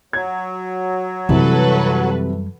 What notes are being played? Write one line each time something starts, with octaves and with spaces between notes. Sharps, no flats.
F#3 G#6
F#2 C3 E3 G3 F#4 A4 B4